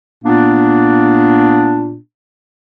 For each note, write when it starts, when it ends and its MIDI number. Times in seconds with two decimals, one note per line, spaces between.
0.24 1.97 46
0.24 1.97 58
0.24 1.97 59
0.24 1.97 62